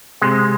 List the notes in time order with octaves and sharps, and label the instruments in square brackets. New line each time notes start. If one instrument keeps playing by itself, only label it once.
[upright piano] C3 [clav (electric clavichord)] G#3